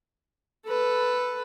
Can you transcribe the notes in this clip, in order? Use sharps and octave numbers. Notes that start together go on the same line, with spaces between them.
A4 B4